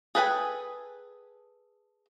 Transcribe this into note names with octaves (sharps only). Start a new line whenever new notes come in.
G#4 A4 B4 G5 G#5